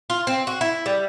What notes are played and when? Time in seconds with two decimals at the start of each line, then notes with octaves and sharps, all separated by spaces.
0.10 F4
0.27 C4
0.47 F#4
0.61 E4
0.86 G3